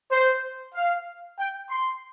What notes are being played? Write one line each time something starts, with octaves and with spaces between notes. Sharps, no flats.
C5
F5
G5
C6